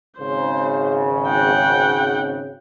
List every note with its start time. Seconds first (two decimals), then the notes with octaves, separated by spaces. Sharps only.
0.19 G#1 C#3 C5
1.27 F#5 G5